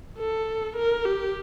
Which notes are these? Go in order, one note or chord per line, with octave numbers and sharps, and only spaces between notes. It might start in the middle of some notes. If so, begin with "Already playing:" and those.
A4
A#4
G4